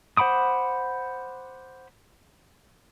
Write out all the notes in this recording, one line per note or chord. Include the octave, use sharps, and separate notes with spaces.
C5 F#5 B5 D6 D#6